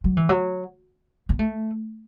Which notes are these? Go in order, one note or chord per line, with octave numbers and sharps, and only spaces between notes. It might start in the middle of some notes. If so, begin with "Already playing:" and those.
F#3
E3
F#3
B3
A3